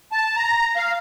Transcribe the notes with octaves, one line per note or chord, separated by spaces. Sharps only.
A5
A#5
F5